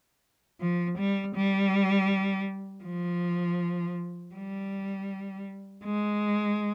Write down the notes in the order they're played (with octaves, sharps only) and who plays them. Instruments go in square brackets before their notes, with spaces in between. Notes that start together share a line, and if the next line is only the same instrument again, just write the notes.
[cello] F3
G3
G3
F3
G3
G#3